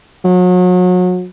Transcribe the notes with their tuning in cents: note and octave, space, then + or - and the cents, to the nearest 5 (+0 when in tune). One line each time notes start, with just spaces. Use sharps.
F#3 -35